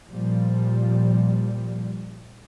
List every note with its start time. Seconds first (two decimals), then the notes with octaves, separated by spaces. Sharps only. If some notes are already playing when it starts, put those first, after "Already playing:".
0.10 A#2 F3 G3